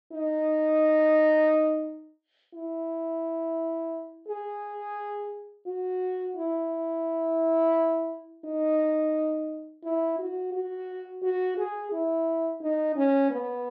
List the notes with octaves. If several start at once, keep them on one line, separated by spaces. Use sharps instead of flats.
D#4
E4
G#4
F#4
E4
D#4
E4
F#4
F#4
F#4
G#4
E4
D#4
C#4
B3